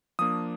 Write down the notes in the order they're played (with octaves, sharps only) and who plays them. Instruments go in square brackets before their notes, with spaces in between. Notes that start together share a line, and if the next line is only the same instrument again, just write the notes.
[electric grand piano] F3 A#3 D4 D#6